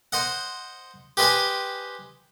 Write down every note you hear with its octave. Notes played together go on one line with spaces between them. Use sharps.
C5 D#5 F#5
G4 B4 C5 D#5 G5 G#5